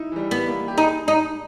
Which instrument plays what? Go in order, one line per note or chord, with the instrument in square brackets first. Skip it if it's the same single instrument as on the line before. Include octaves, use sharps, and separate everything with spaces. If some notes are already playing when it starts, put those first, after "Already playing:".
Already playing: [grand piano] D#4 E4
E3
G3
[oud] B3
[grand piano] A#3
G4
[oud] D#4 [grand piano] G#4
[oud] D#4